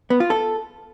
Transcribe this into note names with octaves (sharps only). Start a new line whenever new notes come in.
B3
F4
A4